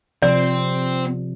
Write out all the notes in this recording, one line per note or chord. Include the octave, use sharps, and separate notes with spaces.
C3 F3 C4 D5